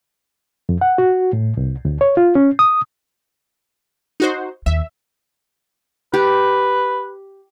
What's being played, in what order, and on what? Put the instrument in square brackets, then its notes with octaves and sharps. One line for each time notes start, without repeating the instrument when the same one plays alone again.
[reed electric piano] F2
F#5
F#4
A2
C2
D2
C#5
F4
C#4
D#6
[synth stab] D#4 F#4 C5
[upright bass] D#2 [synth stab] E5
[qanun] G4 [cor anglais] B4